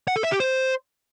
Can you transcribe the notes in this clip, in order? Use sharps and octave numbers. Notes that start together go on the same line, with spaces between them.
F#5
A4
E5
G4
C5